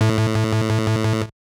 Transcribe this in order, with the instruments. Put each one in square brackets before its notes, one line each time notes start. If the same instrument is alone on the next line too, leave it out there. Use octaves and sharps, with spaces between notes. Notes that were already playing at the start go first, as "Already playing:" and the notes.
[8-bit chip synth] A2